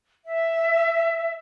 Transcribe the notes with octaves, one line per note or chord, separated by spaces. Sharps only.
E5